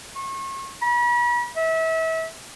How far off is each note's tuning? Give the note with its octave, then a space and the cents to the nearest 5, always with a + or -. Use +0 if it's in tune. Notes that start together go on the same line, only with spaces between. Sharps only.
C#6 -35
B5 -40
E5 -30